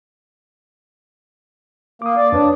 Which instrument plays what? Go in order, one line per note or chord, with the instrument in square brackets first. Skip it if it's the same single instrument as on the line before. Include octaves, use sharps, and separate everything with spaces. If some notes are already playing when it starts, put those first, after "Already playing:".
[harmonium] A#3 [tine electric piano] D6 D#6
[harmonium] D5
[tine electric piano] F2 B4 C#5 [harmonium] D4